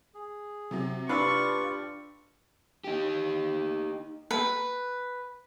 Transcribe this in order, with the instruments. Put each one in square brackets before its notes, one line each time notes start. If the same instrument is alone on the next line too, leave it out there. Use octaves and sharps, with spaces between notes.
[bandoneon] G#4
[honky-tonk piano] C3 F#3
[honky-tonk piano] D4 B5 E6 [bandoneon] F4 G4 [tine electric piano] B4 F5 [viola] C#6
[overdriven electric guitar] D#4 G4
[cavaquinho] B4